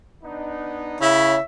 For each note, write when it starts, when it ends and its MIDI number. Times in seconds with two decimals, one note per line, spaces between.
0.24 0.98 59
0.24 0.98 62
0.24 0.98 63
1.01 1.36 49
1.01 1.37 64
1.01 1.42 73
1.01 1.42 76